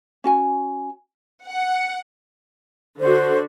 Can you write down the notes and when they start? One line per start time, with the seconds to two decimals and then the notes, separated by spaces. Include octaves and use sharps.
0.24 C#4 F#4 G#5
1.44 F#5
3.00 D3 F#4 C5